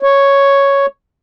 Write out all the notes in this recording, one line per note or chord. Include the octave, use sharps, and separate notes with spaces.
C#5